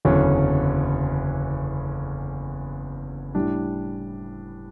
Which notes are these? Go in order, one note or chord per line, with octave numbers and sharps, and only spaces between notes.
F#1 E2 D3 F#3 C#4
A2 G3 D4